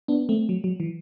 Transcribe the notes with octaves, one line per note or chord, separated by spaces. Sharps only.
B3 D4
A3 C4
F#3
F#3
E3